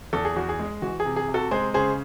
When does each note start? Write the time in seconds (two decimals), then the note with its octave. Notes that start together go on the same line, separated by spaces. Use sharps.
0.13 E2 A4
0.25 G#4
0.36 E2 F#4
0.49 G#4
0.59 G#3
0.82 E3 F#4
1.00 G#4
1.05 C3
1.16 G#4
1.28 C3
1.34 F#4 A4
1.51 G#3 G#4 C5
1.74 C#3 G#4 C5